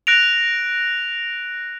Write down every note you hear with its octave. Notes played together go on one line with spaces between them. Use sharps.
F#6 A#6 D7 F7